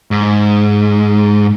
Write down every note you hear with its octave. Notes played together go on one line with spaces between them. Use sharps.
G#2